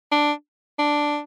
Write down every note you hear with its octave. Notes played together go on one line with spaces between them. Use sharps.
D4
D4